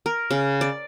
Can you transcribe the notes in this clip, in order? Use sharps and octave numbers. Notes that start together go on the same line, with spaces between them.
A#4
C#3
D5